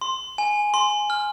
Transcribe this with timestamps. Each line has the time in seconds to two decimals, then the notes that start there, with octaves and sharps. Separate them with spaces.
0.01 C6
0.38 G#5
0.74 C6
1.10 F6